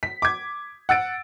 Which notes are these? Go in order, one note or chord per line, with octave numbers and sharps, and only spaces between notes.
B6
D6 G#6
F#5 E6 A6 D7